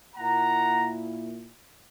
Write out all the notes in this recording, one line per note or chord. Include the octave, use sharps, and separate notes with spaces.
A#2 A#3 E4 F#5 A#5